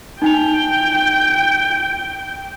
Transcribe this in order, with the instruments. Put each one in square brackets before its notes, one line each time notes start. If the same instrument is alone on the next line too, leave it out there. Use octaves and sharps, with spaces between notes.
[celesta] D#4 G#5 F7 [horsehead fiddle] G5